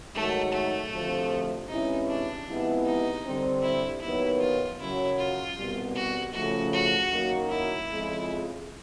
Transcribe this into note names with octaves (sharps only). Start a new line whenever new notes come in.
G#2 D#3 F#3 A3
A3
D2 C3 F3
C3 E3 G#3 C#4 D#4 E4
D4
C3 F3 G#3 B3 E4
D#4
D3 G3 C4
E4
D#2 D#3 F#3 B3 E4
F4
F#2 C#3 F#3 E4
F4
C2 B2 G3
F#4
C#3 F3 A3 F#4
F#4
F#2 D#3 F#3 A#3
E4
F2 C#3 F3 G#3